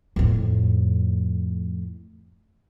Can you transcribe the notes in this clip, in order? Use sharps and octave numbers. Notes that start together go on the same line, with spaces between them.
F2 A2